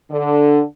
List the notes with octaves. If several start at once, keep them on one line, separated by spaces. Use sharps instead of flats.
D3